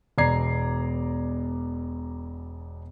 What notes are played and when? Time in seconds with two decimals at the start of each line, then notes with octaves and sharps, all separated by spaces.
0.18 E1 B2 D5 A#5 G#6 C7